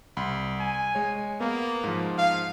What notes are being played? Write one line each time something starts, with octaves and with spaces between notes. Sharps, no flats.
C2 B5 C6
G#5
G#3 C#5
A#3 B3
G#2 F3
F5